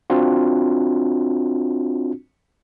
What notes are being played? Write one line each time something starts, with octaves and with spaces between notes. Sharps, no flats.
C4 D4 F4 F#4